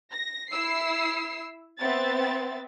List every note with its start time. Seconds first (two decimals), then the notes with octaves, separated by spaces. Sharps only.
0.11 A#6
0.50 E4 E6 C7
1.80 B3 C4 E5 A6